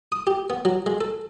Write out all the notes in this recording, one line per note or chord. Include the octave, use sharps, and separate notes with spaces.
D#6
G4
B3
F#3
G#3
A4